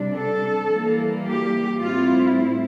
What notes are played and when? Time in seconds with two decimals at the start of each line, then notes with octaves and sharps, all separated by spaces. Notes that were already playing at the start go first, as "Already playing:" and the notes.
Already playing: C3 G3 D4
0.15 A4
0.71 E3 G3 A#3
1.27 G4
1.83 A2 G3 C4 E4 F4